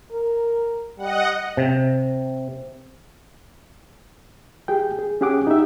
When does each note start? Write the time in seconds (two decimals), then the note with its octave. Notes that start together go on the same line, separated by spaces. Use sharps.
0.12 A#4
0.98 G3 D#5 F#5
1.57 C3
4.68 G4 G#4 G5
4.99 G#4
5.21 C#4 G4 G#4 F#5 D6
5.47 D#4 G4 E5